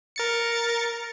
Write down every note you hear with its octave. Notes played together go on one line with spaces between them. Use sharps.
A#4 A6 C#7